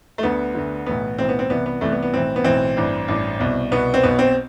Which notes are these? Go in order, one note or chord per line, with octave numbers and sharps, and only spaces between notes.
A3
D2 D3 B3
D2 D3
B1 A2 E3 B3
B1 A2 E3 C4
B3
C4
C2 C3 E3 B3
B3
C2 C3 E3 A3
B3
B3
B1 A2 E3 C4
B3
B1 A2 E3 C4
A1 G2 E3
A1 G2 E3
C2 B2
C2 B2 B3
C4
B1 B2 B3
C4